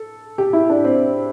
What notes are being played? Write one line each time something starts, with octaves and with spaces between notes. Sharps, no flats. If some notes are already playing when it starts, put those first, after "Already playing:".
Already playing: A4
G4
E4
D4
C4